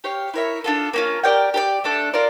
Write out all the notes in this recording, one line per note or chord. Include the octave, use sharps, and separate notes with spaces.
G4 C#5 F5
E4 A#4 C#5 E5
D4 F4 A4
A#3 C#4 F4
G4 A#4 D5 G5
G4 A#4 D5
A3 D4 A4
F4 A#4 D5